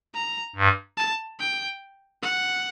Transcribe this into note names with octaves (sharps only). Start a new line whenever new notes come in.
A#5
G2
A5
G5
F#5